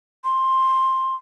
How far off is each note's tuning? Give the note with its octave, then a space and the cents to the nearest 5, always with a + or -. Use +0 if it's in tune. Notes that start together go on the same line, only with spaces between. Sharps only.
C6 +10